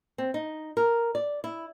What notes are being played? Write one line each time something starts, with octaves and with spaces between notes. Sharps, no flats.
C4
D#4
A#4
D5
E4